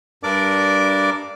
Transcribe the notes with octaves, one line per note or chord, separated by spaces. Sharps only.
G2 D4 A#4 D5 D6